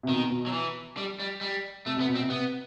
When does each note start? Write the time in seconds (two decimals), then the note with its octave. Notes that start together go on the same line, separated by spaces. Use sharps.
0.03 C3
0.08 B2 D#3
0.30 B2
0.46 F#3
0.52 E3
0.97 G3
1.20 G3
1.41 G3
1.86 C3 A3
1.97 C3
2.00 B3
2.08 B2
2.15 C4
2.20 C3
2.30 C3 B3